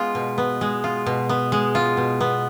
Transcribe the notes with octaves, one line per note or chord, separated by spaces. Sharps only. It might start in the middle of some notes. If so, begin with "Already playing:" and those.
Already playing: G#3 B3 F4
B2
B3
G#3
F4
B2
B3
G#3
F4
B2
B3